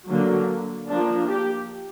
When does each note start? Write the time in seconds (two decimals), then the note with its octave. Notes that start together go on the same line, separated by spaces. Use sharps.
0.09 D3 F#3 A#3
0.88 F3 A#3 D4
1.27 G4